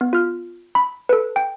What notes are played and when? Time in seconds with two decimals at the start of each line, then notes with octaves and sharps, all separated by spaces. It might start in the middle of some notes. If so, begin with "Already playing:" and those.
0.01 B3
0.13 F4 F6
0.75 B5
1.09 A4 B4
1.36 G5